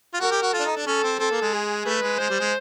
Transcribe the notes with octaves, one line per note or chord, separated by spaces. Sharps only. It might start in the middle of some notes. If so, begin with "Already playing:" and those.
F4
F#4 A#4
G4
F#4
F4 A4
D4
D#4
D4
C#4 A4
C4
C4 A4
A#3
G#3
G#4
A3 B4
G#3
G#3 C5
G3
G#3